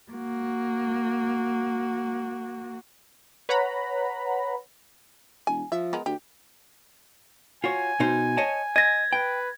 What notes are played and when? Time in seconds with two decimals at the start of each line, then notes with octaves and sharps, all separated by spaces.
0.12 A#3 F#4
3.49 B4 C#5 F#5 A#5 B5
5.47 E1 G#5
5.72 F3 E5
5.93 G#3 B3 A#4
6.06 D2 G4
7.64 F4 F#4 C#5 G#5
8.00 B2 D#4 C5
8.37 C#5 D#5 A5
8.76 D#5 G#6 A#6
9.13 B4 G5